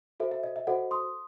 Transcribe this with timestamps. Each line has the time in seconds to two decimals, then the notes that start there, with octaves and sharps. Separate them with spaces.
0.20 F#4 A4 C5 E5
0.31 E5
0.43 D#5
0.56 E5
0.67 F#4 A4 C5 D#5 F#5
0.91 C6 D#6